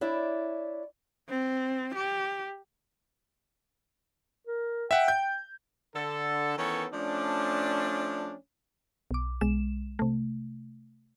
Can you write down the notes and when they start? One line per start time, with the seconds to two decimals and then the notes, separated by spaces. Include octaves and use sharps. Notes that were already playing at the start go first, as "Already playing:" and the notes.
0.01 D4 E4 C#5 D5
1.29 C4
1.95 G4
4.47 A#4
4.91 E5 F#5 G5
5.08 G6
5.96 D3 A4
6.58 D#3 E3 B3 C#4 A4 C#5
6.93 F3 A3 C#4 D4
9.11 B1 D6
9.41 B1 G#3 E7
9.99 C3 A3